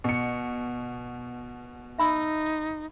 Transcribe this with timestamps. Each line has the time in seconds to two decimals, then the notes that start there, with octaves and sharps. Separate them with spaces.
0.04 B2 C#7
1.99 D#4 E5 B5 E6